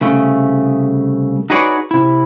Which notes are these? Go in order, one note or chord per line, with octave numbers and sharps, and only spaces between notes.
C2 C#3 A3
D#4 F#4 G#4 B4 C#5 D5
C3 E4